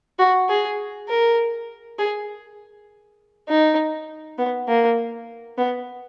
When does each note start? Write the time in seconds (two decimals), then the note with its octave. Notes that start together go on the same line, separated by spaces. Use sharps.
0.19 F#4
0.49 G#4
1.09 A#4
1.99 G#4
3.48 D#4
4.38 B3
4.68 A#3
5.58 B3